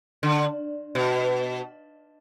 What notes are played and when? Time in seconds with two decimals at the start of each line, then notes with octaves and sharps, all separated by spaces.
0.23 D3
0.95 B2